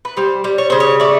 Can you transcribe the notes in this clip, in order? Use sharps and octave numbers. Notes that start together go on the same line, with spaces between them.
B4
G3 C5
G3
C#5
C#3 C5
C#5
A3 D5